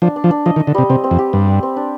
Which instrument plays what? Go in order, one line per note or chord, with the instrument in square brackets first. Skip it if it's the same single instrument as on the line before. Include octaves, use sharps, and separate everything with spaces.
[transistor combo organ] F3 [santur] D4
[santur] D4
[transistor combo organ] F3
[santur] D4
[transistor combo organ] F3 [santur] D#5
[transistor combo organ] D#3
[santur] D#5
[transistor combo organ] D3
[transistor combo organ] C3 [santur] G3
[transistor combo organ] C3 [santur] C4
[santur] C4
[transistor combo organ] F2
[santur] G4
[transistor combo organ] G2 [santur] C4
[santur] D5
C4
D4